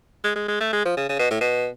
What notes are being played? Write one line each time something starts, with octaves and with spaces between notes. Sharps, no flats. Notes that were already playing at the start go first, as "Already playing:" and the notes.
G#3
G#3
G#3
A3
G#3
F3
C#3
C#3
B2
A2
B2